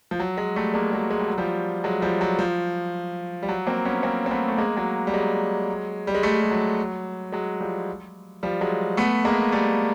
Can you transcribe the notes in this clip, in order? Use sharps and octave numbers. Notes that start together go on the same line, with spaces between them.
F3
F#3
F#3 G#3
G3 A3
G#3 A#3
F#3 G#3
G#3
G3
F#3
F3 G3
F#3 G#3
F3 G3
F#3
F3
G3
F#3
A#3 C4
B3 C#4
A#3 C4
C4
A3 B3
A3
G#3 A#3
F#3 G#3
G3
F#3 G#3
G3
G#3
G3 A3
G3
F#3
F#3 G#3
F3 G3
F3 G3
F#3 G#3
A3 B3
G#3 A#3
G3 A3